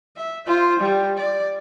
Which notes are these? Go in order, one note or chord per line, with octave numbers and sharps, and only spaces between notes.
E5
F4 C5
G3
D5